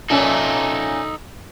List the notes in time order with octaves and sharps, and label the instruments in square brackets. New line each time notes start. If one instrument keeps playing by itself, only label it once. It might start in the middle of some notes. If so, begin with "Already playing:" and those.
[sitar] A#2 C#4 E5 [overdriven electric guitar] D#4 A4